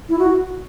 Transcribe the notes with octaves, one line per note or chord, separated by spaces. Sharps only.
E4
F#4